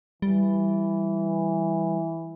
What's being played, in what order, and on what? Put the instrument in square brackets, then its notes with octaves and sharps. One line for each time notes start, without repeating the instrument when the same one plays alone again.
[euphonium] E3 [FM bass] G3